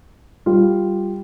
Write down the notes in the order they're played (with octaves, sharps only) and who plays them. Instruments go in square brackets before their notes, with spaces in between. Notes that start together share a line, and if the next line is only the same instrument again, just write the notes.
[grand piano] G3 F4